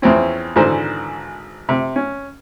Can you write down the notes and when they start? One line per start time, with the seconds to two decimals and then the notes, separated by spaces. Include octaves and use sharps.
0.02 E2 F3 C4 C#4
0.56 G#1 G#2 D3 E3 C5
1.69 C3
1.96 C#4